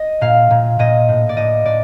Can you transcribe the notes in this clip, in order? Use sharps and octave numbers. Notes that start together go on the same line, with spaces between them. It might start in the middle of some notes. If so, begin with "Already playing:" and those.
Already playing: D#5
A#2 F5
A#2
A#2 D#5
A2
D5
A2 D#5
A2 D5